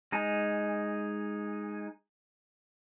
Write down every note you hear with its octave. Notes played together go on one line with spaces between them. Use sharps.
G#3 D#4 G#5